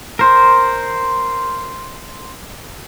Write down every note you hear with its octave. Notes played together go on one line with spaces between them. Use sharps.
A#4 C5